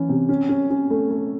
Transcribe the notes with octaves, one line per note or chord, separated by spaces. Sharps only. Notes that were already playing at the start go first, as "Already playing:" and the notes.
Already playing: E3 C#4
C3
C#4
C#4
C#4
A3
A3